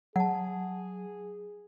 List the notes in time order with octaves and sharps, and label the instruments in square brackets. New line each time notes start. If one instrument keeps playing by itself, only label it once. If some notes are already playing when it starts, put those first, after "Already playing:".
[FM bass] F#3 [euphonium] G#4 [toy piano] F#5 A5